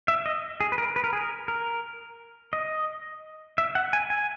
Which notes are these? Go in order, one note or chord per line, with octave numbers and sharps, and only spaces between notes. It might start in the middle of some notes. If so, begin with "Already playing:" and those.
E5
D#5
G#4
B4
A#4
B4
A#4
G#4
A#4
A#4
D#5
E5
F#5
G#5
G#5